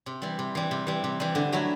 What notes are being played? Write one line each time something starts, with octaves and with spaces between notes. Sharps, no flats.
C3
E3 G3
C3
E3 G3
C3
E3 G3
C3
E3 G3
D3
F#3 A3 E4